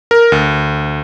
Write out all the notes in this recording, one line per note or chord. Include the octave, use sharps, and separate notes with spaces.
A#4
D2